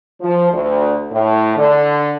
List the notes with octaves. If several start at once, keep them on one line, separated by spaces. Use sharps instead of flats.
F3
D2
A2
D3